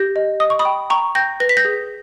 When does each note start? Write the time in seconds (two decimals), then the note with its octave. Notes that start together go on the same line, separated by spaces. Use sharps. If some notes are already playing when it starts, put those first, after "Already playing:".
Already playing: G4 G6 A#6
0.16 D#5
0.40 D#5 D#6
0.50 C#6
0.59 B5 D#6
0.65 G5
0.90 G5 A#5 C#6
1.15 G5 G6 A#6
1.40 B4 A#6
1.49 B6
1.57 G6 A#6
1.65 G#4